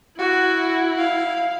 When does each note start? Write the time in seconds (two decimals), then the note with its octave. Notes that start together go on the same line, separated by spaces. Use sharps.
0.18 E4 F#4
0.98 F5